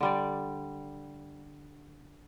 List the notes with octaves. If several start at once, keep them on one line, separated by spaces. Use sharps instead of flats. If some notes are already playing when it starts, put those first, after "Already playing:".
D3 G3 D5